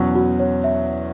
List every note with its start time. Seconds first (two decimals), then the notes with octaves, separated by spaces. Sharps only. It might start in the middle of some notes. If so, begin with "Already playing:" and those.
Already playing: E2 B2 F#3 C#4
0.15 F#4
0.39 C#5
0.64 E5